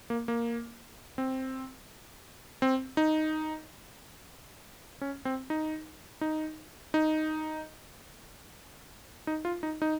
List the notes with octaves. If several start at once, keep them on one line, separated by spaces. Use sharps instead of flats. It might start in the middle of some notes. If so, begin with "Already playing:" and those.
A#3
A#3
C4
C4
D#4
C#4
C4
D#4
D#4
D#4
D#4
F4
D#4
D#4